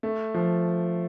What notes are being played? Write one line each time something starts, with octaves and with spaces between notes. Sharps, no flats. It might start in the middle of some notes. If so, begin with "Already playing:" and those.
A3
F3